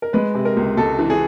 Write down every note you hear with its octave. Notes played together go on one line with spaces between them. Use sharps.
A#4
G#3 B4
C3
A#4
C#2
C#2 A4
E3
G#4